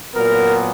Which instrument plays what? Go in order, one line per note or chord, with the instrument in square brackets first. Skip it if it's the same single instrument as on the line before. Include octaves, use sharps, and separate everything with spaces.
[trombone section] A#2 F#3 B3 A#4